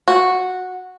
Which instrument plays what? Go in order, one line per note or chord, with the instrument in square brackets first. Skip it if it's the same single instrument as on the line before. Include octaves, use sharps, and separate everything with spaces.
[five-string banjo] F#4